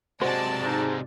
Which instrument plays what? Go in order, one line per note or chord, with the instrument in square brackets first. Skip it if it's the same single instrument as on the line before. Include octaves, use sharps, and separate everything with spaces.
[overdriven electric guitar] C3 G#3 [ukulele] F#4 C5 [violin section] D5 A5
[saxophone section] G#2